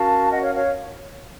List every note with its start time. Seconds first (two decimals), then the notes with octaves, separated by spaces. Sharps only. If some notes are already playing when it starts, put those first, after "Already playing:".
Already playing: C#4 F#4 A#4 F5 A5
0.31 D#5 F#5
0.43 C#5 F5
0.55 C#5 F5